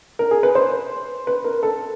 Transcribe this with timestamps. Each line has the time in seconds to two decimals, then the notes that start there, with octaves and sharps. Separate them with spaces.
0.19 A#4
0.31 G#4
0.43 B4
0.55 C5
1.27 B4
1.44 A#4
1.63 A4